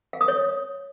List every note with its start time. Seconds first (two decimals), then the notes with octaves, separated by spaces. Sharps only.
0.13 F5
0.21 D#6
0.28 C#5